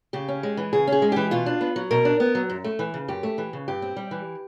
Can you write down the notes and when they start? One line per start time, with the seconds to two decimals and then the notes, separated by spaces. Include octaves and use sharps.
0.13 C#3 G4
0.28 C#4
0.43 G#3
0.57 E3
0.73 C#3 G#4
0.87 C#4 G#4
1.02 G#3
1.12 E3 G4
1.31 B2 F4
1.46 D4
1.61 B3
1.76 F#3
1.91 B2 A#4
2.05 D4
2.20 B3
2.35 F#3
2.50 F#2
2.64 A3
2.79 E3
2.94 C#3
3.08 F#2 G4
3.23 A3
3.38 E3
3.53 C#3
3.68 G2 G4
3.82 C4
3.97 G3
4.11 E3